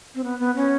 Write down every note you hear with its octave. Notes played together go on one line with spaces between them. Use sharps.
C4
B3
B3
C#4